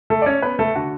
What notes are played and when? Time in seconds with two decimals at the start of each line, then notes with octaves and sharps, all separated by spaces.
0.10 A3 A4
0.22 D5
0.26 C#4 C#5
0.42 B3 B4
0.59 A3 A4
0.76 D3 F#4